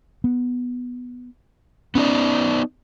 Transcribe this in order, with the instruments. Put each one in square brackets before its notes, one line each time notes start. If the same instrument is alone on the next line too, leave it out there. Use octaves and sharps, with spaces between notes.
[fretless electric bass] B3
[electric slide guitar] B3 D#4 D5 [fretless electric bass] C#4